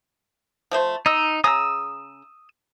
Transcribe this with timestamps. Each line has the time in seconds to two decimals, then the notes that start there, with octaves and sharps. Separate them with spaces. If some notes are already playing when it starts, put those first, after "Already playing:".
0.71 F3 A3 C5
1.06 D#4 D#5 E6
1.44 C#3 G#4 A#5 D#6 E6